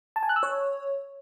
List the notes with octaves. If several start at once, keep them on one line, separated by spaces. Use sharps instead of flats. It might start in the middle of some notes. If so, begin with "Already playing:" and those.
A5
G#5
F#6
E6
C#5